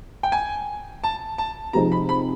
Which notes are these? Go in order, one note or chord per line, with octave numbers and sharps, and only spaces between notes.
G5
G#5
A5
A5
C3 F3 G#3 C4 D#4 A#5
B5
B5